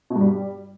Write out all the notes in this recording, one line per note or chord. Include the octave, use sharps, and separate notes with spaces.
B2
G2
G3